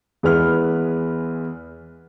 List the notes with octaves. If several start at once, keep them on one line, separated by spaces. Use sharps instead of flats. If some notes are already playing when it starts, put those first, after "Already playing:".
E2 G#3 E4 B4 F6